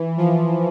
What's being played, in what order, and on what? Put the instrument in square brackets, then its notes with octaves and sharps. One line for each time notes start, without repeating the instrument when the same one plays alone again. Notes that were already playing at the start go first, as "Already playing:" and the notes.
Already playing: [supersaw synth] E3
F3